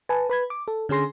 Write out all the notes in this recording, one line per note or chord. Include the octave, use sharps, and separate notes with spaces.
B4 G#5 A5
B4 B5 G#6
D6
A4
D3 C#4 G#4 C6 A#6